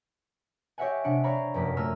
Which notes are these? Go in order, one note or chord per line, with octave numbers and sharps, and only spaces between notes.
G4 C#5 D#5 E5 F#5 G#5
C3 D4 F#5 C#7 D7
C#5 D5 F5 A#5 B5
F1 F#2 A#3 B6
A#2 A3 A#3 E6 F6 D#7